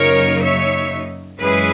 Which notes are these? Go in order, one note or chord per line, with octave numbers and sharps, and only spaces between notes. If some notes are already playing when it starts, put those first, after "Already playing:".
Already playing: F#2 C#3 F#3 A#3 D#4 A#4 C#5
C#5 E5
F#2 E3 G#3 C#4 E4 G#4 B4